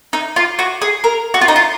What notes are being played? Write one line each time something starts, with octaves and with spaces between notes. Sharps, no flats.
D#4
F4
F#4
G#4
A#4
F#4
F4
D#4
F4